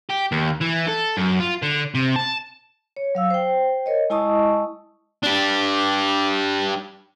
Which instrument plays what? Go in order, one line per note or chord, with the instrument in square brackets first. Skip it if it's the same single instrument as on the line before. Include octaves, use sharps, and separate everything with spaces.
[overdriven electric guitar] G4
D#2
E3
A4
F#2
F4
D3
C3
A5
[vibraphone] C#5
F#3 F5 E6
C5 G5
A#4 C#5 D#5
G#3 E4 D#5 A5 C#6 D#6
[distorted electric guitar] D4 G4